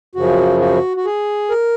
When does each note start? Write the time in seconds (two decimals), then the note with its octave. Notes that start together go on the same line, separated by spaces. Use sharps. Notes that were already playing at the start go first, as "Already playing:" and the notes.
0.15 F#2 C#3 F3 F#4
0.60 F#4
0.97 F#4
1.06 G#4
1.50 A#4